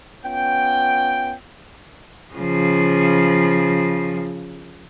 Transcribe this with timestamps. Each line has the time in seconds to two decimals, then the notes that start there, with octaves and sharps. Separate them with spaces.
0.24 B3 C#4 F4 G5
2.35 C#3 F3